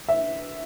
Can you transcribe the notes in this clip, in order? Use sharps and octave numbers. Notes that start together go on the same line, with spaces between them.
E5